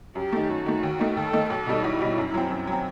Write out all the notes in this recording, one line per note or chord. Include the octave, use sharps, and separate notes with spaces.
F#2 G4
D#3 A3
F#2 F#4
D#3 A3
D#2
D#3 A3 D#4
D#2 A4
D#3 A3 D#4
B1 A4
B2 G3 D#4
B1 E4
B2 G3 D#4
F#2
F#3 C4
F#2
F#3 C4